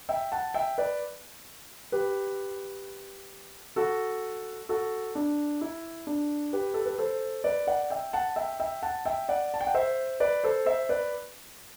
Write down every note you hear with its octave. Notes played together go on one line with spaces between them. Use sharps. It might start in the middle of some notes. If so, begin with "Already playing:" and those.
E5 G5
F#5 A5
E5 G5
B4 D5
G4 B4
F#4 A4
F#4 A4
D4
E4
D4
G4 B4
A4
B4
A4 C5
B4 D5
D5 F#5
E5 G5
F#5 A5
E5 G5
E5 G5
F#5 A5
E5 G5
D5 F#5
A5
G5
F#5
C5 E5
B4 D5
A4 C5
C5 E5
B4 D5